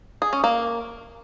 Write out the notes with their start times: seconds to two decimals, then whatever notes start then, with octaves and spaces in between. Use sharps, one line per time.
0.22 G#4
0.33 C#4
0.44 A#3